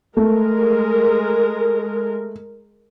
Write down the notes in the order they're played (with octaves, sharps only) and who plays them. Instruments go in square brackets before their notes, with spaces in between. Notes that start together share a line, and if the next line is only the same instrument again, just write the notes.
[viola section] G#3 A#4 [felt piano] A3